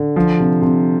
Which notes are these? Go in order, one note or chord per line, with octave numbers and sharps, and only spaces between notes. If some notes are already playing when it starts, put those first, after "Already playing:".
Already playing: D3
F3
C3
C3